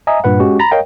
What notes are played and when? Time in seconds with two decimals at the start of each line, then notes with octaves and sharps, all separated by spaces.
0.07 D#5 E5 G#5 A#5 D#6
0.24 G2 A#2 B4 F#5
0.40 G#3 C#4 F#4 G4
0.60 A#5 B5 A6 A#6
0.71 A#4 C#5 D#5 F5 G5